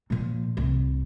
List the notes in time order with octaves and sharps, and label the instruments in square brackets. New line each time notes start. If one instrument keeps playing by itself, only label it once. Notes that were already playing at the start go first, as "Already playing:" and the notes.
[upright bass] A#2 F3
C2